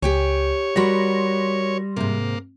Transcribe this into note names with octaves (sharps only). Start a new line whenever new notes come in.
C#2 G4 C#5 G5 G#5
G3 F#4 A#4 B4 C6 A#6
G#2 C3 A#3